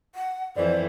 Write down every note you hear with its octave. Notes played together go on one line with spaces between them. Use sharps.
F#5
F2 E3 C5 D5